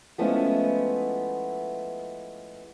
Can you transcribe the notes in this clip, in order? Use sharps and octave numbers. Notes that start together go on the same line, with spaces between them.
F3 G#3 A3 B3 C#4 E4